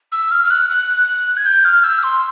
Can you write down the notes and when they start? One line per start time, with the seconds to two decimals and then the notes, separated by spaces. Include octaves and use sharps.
0.11 E6
0.31 F6
0.44 F6
0.50 F#6
0.69 F#6
1.36 G#6
1.45 G6
1.64 F6
1.83 E6
2.03 C6